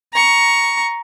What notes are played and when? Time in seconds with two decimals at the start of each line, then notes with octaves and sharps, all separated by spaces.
0.13 A#5 C#6